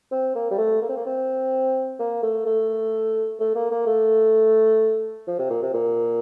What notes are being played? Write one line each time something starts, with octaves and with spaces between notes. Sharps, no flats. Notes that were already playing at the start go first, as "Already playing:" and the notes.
C4
A#3
G3
A3
A#3
C4
A#3
C4
A#3
A3
A3
A3
A#3
A#3
A3
F3
C3
A#2
C3
A#2